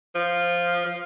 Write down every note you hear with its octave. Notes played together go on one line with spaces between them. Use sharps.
F3
F3